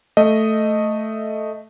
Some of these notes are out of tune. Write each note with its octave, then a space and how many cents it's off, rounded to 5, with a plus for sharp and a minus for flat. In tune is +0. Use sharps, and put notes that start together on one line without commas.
A3 +0 D#5 +0